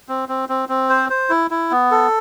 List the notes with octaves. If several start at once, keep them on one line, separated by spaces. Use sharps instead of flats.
C4
C4
C4
C4
C5
C5
E4
E4
B3
A4